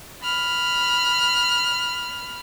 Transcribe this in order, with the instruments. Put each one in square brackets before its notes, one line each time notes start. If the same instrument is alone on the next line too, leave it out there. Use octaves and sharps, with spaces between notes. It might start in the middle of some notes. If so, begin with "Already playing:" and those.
[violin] B5 F6